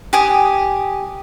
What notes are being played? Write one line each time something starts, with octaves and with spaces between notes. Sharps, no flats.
G4 G#5 D#6